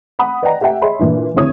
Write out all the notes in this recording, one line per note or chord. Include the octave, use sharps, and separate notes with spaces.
F#5 B5 D#6
B4 D5 D#5 F#5 G5 A#5
G4 E5 F#5 G5
G#4 C#5 D#5 E5 B5 C6
A#2 E3 D4
F1 C2 D3 E4 C#5 D#6